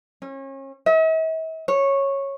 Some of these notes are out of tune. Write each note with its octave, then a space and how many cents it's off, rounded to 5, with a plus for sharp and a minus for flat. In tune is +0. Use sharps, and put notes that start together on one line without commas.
C#4 -35
E5 -45
C#5 -10